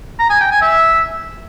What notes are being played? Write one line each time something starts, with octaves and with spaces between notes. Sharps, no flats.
A#5
G#5
G5
G#5
E5